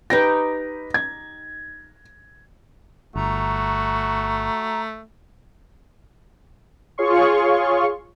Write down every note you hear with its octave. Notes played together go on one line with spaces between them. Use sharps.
D#4 G4 B4 G5 A#6
G#6
G1 A3 F#4 A#5
F4 G#4 C#5 F5 C6 C#6